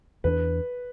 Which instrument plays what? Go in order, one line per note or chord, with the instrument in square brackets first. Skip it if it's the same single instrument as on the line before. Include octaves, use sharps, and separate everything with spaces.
[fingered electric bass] E2 E3 A3 D4 [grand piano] B4